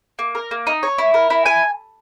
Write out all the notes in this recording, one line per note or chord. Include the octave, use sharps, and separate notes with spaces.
A#3
A#4
A#3
D#4
C#5
E4
A#4
E4
G#5